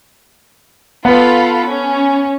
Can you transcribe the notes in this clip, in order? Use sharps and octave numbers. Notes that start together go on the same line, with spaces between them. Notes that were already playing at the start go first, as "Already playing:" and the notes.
B3 F4 A4 B4 B5
C#4